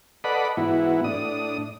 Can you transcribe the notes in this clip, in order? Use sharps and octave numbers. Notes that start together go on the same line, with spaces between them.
A4 B4 D5 D#5 F#5 B5
G#2 E3 B3 E4 F#4
A2 D4 D#6